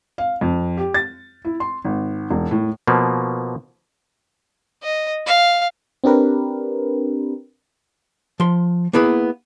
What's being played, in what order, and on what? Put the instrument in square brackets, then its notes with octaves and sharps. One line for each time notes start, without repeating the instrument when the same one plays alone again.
[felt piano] F5
F2
G4
A6
E4
C6
G#1
E1
A2
[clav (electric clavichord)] B2 F3 A#3
[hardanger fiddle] D#5
F5
[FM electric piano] C4 D4 G4 A#4 B4
[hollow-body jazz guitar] F3 C6
A#3 B3 E4 G#4 B4